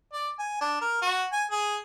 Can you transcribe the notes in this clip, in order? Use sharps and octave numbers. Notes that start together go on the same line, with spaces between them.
D5
G#5
D4
A#4
F#4
G#5
G#4